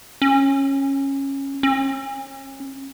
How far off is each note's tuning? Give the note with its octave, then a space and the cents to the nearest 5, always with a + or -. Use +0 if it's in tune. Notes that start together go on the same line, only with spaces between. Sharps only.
C#4 -15
C#4 -35